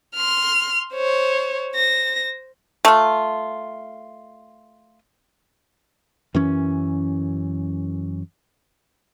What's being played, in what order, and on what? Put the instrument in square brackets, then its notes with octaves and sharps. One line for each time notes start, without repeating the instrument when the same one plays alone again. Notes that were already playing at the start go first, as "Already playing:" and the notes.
[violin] C6 F6
C5 C#5
C5 A#6
[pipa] A3 F4
[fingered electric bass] F#2 E3 C#4